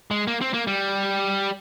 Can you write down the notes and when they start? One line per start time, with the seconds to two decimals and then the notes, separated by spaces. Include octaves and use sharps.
0.11 G#3
0.27 A#3
0.41 C4
0.54 A#3
0.67 G3